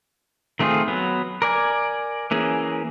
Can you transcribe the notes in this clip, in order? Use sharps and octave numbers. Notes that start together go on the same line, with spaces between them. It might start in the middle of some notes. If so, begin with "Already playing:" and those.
D#3 A3 C4 F4 G#4
F#3 B3
A#4 D5 G#5
E3 A#3 C#4 G#4